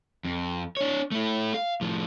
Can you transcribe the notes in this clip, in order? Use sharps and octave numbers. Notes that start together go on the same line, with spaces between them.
F2
D4 C#5
A3 E4
F5
A2 F3